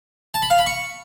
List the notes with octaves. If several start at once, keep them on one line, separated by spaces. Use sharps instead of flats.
A5
B5
F5
B5
C#6